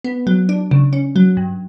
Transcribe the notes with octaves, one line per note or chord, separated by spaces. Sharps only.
B3
F#3
D4
C#3
C#4
F#3
G2